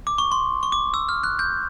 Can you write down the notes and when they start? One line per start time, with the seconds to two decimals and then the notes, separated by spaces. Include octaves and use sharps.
0.07 D6
0.18 C#6
0.32 C6
0.63 C#6
0.72 D6
0.94 E6
1.09 F6
1.24 F#6
1.39 G6